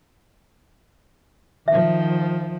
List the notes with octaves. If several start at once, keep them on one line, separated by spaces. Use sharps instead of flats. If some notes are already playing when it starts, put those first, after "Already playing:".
D#3 F3 E5